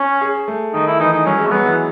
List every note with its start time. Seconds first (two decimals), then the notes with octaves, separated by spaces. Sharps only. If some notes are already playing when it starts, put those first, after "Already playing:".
Already playing: C#4
0.21 G#4
0.48 A3
0.74 D#3 D#4
0.87 E4
1.00 E3 D#4
1.13 D#4
1.26 F#3 C#4
1.39 G#3
1.47 A3
1.51 F#3 B3
1.65 E3